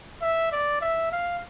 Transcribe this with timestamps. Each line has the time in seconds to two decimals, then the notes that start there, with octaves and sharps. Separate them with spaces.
0.22 E5
0.52 D5
0.81 E5
1.12 F5